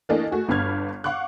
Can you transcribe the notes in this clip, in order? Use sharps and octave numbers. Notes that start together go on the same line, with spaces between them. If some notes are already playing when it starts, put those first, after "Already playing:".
E3 A3 A#3 D4 A4 D#5
A3 F#4 G#4
G1 G2 B3 F6 G#6
F5 F#5 C#6 D6 F#6